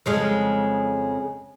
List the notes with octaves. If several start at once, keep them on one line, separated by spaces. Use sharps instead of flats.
F2 C#3 G#3